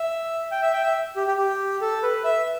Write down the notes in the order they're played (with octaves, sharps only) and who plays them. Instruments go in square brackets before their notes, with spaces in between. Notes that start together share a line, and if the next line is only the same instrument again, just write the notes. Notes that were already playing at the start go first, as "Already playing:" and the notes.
Already playing: [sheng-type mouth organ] E5
G5
E5
G5
E5
G4
G4
G4
A4
B4
E5